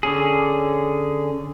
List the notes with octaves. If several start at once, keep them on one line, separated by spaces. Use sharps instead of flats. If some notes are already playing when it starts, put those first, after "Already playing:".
D3 C#4 G#4